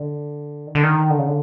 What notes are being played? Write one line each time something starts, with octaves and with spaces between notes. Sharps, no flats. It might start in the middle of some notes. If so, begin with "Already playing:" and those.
Already playing: D3
D#3
D3
D#3
D3
C#3
D3